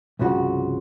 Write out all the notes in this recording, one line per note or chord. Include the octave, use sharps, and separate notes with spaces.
C2 G2 C#3 F3 F#4